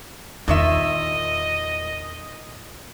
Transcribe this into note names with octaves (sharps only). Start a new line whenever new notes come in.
E2 A#2 D#3 D#5 E5